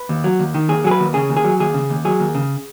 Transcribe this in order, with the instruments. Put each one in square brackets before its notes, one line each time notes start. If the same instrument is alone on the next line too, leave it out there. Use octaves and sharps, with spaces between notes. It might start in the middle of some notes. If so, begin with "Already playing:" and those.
Already playing: [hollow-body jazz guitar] B4
D#2
F#3
D#2
D#3
D#2 G#4
F#3 G#4
B4
D#2
C#3 G#4
D#2
G#4
F#3
D#2 G#4
C#3
D#2
F#3 G#4
D#2
C#3